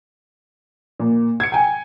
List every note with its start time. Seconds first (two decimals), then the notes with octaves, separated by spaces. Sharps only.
1.00 A#2
1.40 G#6 C#7
1.52 G5 G#5